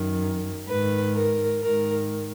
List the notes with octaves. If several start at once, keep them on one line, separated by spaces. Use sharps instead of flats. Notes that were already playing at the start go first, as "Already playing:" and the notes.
Already playing: F#2 D#3
G#2 D#3 B4
A#4
G#2 D#3 A#4